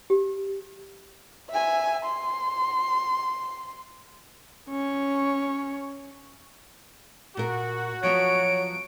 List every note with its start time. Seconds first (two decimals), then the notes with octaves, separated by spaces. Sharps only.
0.10 G4
1.51 E5 G#5
2.05 C6
4.69 C#4 C#5
7.37 A#2 F#4 A#4
8.03 F3 F#3 B3 C#5 D7